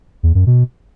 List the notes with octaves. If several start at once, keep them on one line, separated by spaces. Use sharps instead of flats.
E2
F#2
B2